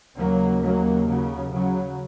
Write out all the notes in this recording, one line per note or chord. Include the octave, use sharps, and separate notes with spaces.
D#2 C#3 F#3 A#3
F#3 A#3
C#3 F#3
C#3 F#3